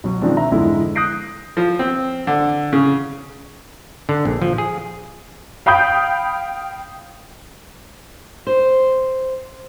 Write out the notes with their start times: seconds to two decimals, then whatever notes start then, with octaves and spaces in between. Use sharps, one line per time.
0.04 B2 F#3
0.22 D#3 F3 G#3 C4 D4
0.37 E5 A#5
0.52 F2 G#2 D3 E3 G#3 E4
0.95 D#6 F#6 G6 A#6 C7 D7
1.57 F3
1.79 C4
2.27 D3
2.73 C#3
4.09 D3
4.25 A#1
4.42 F3
4.58 G#4
5.66 F5 G5 B5 D#6 G6
8.47 C5